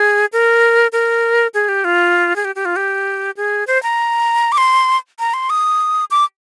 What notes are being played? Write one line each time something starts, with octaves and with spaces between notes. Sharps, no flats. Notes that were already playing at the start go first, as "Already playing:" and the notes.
Already playing: G#4
A#4
A#4
G#4
G4
F4
G#4
G4
G4
F4
G4
G#4
C5
A#5
D6
C6
A#5
C6
D#6
D6